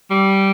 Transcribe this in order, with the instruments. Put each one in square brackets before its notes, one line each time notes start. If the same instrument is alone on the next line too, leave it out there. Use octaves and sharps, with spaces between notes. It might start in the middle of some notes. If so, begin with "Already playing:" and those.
[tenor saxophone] G3